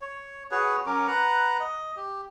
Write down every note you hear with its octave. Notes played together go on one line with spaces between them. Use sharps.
C#5
F#4 G#4 B4 C#5
F#3 C#4 A#4 D6
B4 F#5 A#5
D#5
G4